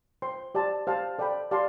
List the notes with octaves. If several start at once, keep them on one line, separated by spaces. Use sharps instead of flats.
C5 G5 C6
G4 D5 A5 C6
G4 C5 F5 A5
A4 D5 G5 B5
G4 D5 F5 A5 C6